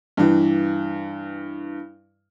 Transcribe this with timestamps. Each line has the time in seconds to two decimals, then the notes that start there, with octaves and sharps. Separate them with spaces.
0.17 G2 E3